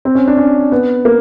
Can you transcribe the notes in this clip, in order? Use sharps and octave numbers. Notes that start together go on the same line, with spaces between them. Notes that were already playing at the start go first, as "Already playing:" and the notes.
C4
C#4
D4
C#4
B3
A#3